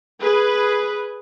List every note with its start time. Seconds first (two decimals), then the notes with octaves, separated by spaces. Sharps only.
0.22 G#4 B4